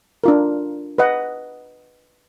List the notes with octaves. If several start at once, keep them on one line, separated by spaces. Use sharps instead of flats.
D4 F4 A#4
B4 D#5 F#5